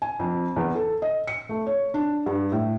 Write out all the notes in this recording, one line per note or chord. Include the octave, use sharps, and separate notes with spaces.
G#5
F2
E2
A4
D#5
C#7
A3
C#5
D4
G2
A2